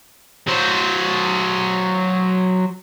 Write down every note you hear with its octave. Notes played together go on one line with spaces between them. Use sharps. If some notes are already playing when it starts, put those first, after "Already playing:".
F#3 C5